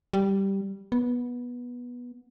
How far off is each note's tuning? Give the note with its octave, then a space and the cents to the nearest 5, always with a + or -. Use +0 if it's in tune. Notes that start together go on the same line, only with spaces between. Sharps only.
G3 -5
B3 -15